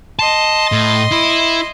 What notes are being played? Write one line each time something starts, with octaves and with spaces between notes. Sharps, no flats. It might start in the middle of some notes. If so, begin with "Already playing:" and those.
D#5 A5 C6
A2
E4